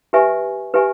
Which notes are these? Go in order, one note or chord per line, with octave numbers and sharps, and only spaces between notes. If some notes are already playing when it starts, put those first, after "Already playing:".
G4 B4 E5 G#5 C#6
G4 B4 E5 G#5 C#6